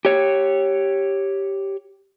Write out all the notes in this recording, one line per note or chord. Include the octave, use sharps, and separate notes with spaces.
G4 C#5